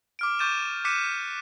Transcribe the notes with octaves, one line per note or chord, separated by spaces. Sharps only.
D6 F6 D7
C#6 D6 G6 A6 D#7 E7
D6 F#6 B6 C#7 D#7 E7